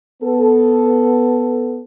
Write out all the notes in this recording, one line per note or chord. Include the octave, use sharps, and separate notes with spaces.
B3 A4